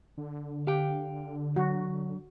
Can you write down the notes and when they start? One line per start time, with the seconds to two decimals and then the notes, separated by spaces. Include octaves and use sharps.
0.18 D3
0.67 G4 F5 G5
1.56 F#3 F#4